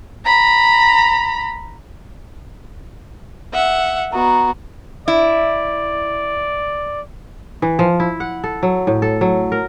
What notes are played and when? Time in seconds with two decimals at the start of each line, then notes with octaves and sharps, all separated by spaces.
0.25 A#5 B5
3.54 E5 F#5
4.12 B3 F#4 D#5 A#5
5.08 E4 D5
7.62 E3
7.79 F3
8.00 E4
8.20 F#5
8.44 A4
8.63 F#3
8.87 A2
9.02 A4
9.21 F#3
9.52 A#4